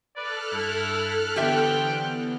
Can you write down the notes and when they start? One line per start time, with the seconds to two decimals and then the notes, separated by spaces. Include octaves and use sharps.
0.16 A4 B4 D5 F6 F#6
0.51 G2 E4
1.36 D3 E3 B3 G4 C5 E5 G5